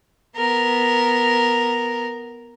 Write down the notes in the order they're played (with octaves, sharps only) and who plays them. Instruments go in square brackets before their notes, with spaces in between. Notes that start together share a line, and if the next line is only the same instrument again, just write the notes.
[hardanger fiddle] B3 A#4